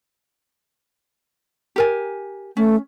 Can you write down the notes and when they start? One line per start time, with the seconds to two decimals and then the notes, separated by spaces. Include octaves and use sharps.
1.76 G4 A#4 G#5
2.57 A3 C#4